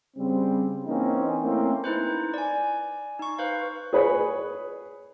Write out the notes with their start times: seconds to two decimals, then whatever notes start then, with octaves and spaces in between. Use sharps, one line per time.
0.17 C#3 G3 C4
0.87 E3 A#3 C4 C#4 D#4
1.42 A3 A#3 C4 C#4 E4
1.84 D#4 E4 B4 C5
2.34 D5 G#5
3.19 D#4 C#6
3.38 B4 C5 F5
3.93 G#4 B4 C#5